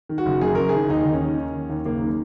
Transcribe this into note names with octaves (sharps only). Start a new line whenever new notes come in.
D#3
F#4
F#1
F#2 G#4
F#1 A#4
D#3 G#4
D#2 D#4
D#2
C#4
D#3
D#3
D#2
D#2
F#1 A#3
D#3